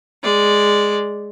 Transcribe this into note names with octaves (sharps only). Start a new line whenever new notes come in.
G#3 D5